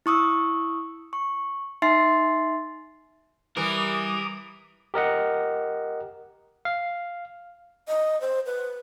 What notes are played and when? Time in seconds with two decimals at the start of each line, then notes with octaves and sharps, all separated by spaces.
0.06 E4 C#6 D#6 E6
1.13 C#6
1.82 D#4 E5 C6 A6 C7
3.57 E3 G3 A#4 D6 D#6
4.94 G4 A#4 D#5 F#5
6.65 F5
7.88 D#5
8.21 C5
8.46 B4